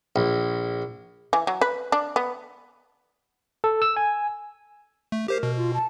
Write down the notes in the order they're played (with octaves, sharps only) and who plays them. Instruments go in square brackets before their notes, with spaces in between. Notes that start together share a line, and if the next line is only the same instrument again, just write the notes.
[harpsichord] A#1
[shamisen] E3
F#3
B4
D4
B3
[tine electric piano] A4
E6
G#5
[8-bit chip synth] A3
[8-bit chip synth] G4 C5 C7 [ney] A#4
[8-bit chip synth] B2
[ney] F4
A5